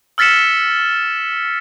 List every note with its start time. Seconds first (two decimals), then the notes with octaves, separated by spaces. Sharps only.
0.18 E6 F6 A6 B6 C#7 E7